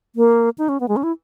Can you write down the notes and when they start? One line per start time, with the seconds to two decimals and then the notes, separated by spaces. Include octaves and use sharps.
0.16 A#3
0.58 D#4
0.69 C#4
0.80 B3
0.88 G#3
0.96 C#4
1.03 E4